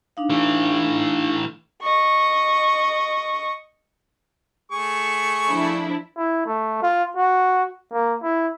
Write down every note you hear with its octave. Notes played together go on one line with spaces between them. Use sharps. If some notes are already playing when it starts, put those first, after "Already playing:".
D4 D#4 F5
E3 A3
D#5 C#6
A3 G#4 C#6
F3 D4 E4
E4
A3
F4
F#4
A#3
E4